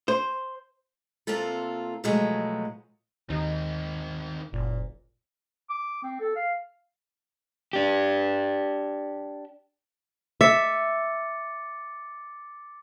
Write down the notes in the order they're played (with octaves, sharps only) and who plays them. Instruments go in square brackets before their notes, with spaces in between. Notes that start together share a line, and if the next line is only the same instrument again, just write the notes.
[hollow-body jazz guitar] C5
[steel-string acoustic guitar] C3 A#3 C4 F4 A4
B2 F3 F#3 G#3 A3
[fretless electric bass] D#2 [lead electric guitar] D#3 C4 [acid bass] D#4
[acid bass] F#1 [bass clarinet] A#2
[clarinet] D6
C4
A4
F5
[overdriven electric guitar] D4 G4
[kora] E5 [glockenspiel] D6 A6 C#7